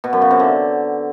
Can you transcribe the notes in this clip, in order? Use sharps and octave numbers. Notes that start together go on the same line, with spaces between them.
B2
F#2
C#3
C3
D3